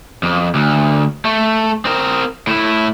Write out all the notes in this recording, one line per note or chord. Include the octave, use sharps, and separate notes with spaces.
F2
D2
A3
C4 A#4
A2 E4